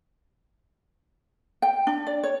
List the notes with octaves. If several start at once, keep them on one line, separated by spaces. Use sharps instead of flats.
G5
D4
D5
C#5